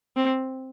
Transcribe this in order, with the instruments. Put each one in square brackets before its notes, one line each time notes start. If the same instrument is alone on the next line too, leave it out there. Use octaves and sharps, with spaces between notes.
[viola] C4